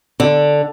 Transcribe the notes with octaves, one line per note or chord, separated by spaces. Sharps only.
D3